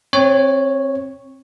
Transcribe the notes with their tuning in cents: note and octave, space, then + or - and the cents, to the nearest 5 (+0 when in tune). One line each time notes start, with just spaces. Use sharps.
C4 +25 C#5 -5